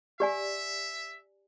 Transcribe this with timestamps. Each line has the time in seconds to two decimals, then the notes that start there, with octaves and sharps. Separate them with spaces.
0.20 G4 D5 E5 G#5